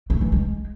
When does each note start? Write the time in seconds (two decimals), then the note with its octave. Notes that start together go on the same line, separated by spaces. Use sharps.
0.10 A3
0.21 E3
0.32 G#3